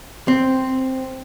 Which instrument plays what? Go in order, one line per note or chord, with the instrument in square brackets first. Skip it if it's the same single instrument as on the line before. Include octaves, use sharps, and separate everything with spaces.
[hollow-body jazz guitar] C4